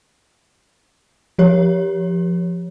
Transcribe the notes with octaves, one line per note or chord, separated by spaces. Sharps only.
F3 G4 C#5